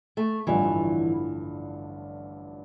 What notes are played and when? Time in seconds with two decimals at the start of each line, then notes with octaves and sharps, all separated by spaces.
0.17 A3
0.47 A1 G2 D3 E3 F3